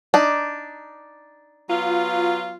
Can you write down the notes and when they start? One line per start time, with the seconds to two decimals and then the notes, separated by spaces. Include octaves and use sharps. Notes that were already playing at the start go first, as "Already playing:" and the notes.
0.14 D4 D#4
1.69 F#3 B3 F4